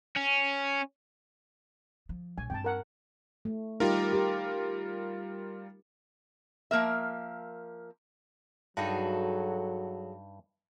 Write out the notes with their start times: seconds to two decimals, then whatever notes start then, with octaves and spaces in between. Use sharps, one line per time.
0.17 C#4
2.09 F3
2.38 A#1 G#5
2.50 G2 C4 G5 A5
2.64 A#4 F#5
3.45 A3
3.80 G3 D#4 F4 G4 A#4
4.13 G4
6.71 F3 A#3 A#4 E5
8.77 G2 F#3 D#4 F#4 G#4 A4